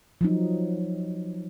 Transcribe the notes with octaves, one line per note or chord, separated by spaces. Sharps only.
F3 F#3 D#4